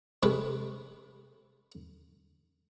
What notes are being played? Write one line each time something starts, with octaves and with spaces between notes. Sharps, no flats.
C3 G#3 A3 B4